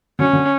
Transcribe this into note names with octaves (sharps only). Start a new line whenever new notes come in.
D3 F#3 C#4
D3 F#3